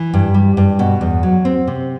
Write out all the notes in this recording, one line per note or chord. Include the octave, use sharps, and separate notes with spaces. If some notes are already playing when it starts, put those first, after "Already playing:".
Already playing: E3
G2
G3
G2
B2
E2
F#3
C4
C3